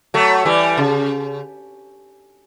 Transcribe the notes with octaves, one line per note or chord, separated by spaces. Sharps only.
F#3 A3
E3 G3
C#3